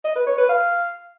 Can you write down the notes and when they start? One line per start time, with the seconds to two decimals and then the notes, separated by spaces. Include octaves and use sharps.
0.04 D#5
0.16 B4
0.27 C#5
0.38 B4
0.49 F5